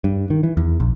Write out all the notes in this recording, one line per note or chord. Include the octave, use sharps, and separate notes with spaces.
G2
D#3
E3
E2
A#1